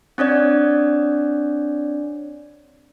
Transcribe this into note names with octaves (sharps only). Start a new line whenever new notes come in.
C4 D4 C#5 D5